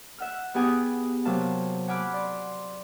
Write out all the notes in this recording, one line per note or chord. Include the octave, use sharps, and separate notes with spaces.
E5 F#5 F6
B3 E4 G4 G#4 F#5 G#5
C3 F#3 A#3 F5 A5
F#5 G#5 B5 D6 F6
D5 C6